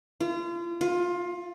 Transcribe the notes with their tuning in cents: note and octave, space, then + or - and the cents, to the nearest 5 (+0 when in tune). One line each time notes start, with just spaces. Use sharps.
F4 -35
F4 +20